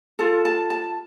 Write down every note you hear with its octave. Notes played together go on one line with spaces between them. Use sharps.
F4 A4 A5
A5
A5